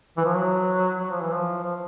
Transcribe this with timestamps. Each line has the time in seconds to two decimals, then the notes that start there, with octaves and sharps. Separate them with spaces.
0.18 E3
0.26 F3
0.34 F#3
0.99 F#3
1.11 F3
1.21 E3
1.33 F3
1.64 F3